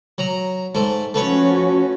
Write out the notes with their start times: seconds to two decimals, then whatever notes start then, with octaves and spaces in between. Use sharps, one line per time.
0.18 F#3 A#5
0.75 G#2 A3
1.14 F3 A3 C#4 F#4 B4 C#5